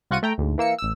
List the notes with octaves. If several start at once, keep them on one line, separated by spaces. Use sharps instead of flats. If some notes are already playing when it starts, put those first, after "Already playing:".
C2 F4 F#4 F#5 C#6 D#7
A3 G5 A#5
D2 G#2
E3 A#3 E6 C#7
A1 E6